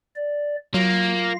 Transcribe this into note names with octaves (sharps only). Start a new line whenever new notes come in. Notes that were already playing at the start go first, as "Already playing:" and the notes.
D5
F#3 A#3 F4 F5 A#6